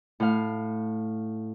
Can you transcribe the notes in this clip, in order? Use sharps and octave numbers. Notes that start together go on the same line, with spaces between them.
A2 F5